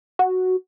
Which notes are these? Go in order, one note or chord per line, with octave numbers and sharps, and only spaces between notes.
F#4